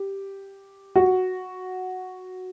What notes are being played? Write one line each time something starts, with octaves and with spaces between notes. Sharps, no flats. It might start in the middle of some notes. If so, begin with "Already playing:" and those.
Already playing: G4
F#4